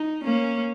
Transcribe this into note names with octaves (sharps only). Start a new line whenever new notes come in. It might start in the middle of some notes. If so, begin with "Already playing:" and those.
Already playing: D#4
A#3 C#4